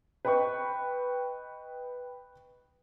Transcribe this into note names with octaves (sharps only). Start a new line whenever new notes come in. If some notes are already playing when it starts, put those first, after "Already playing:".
B4 D#5 G5 B5 C#6